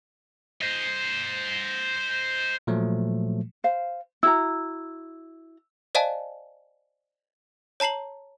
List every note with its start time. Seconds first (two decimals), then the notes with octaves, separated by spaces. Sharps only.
0.61 C5 D#5
2.67 A#2 F3 F#3 A3
3.64 C5 F5
4.23 E4 F#4 A#5 E6
5.95 C5 D5 D#5 F5 G#5 A5
7.80 C#5 A5 A#5 C7 F#7